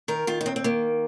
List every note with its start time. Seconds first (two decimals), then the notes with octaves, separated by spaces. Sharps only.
0.08 D#3 A#4
0.27 D#3 F4
0.41 D#4
0.46 D#2 C4
0.56 C4
0.64 D#3 A#3